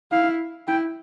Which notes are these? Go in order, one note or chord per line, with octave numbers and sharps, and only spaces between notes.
E4 F5
E4 G5